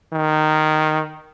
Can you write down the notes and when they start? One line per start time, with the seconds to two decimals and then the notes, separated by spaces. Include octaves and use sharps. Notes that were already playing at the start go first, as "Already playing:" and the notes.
0.13 D#3